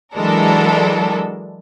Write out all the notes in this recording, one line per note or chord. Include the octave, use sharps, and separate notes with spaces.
E3 F#3 G#3 D4 A4 A#4